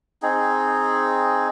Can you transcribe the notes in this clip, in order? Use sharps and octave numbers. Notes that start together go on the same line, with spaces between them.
C4 D#4 G#4